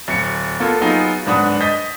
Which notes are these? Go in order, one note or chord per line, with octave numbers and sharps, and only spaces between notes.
D1 C#7
A#3 B3 F4 A4
F#3 B3 D#4 F4 G#4
D1 G#2 D4 B4 F#5 D#6
D#5 G6 A6 B6